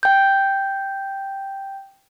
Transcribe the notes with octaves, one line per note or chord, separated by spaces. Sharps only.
G5 G6